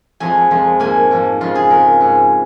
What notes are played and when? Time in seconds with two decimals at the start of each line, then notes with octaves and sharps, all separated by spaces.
0.20 F2 F3 G#3 G#5
0.51 F2 F3 G#3
0.80 G#2 F3 A#3 G#5
1.11 G#2 F3 A#3
1.41 F2 C#3 G#3 F4
1.55 G#4
1.70 F2 C#3 G#3 A#4
2.01 G#2 G#3